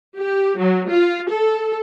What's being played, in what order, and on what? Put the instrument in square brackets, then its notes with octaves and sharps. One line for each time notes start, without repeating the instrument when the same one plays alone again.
[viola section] G4
F#3
F4
A4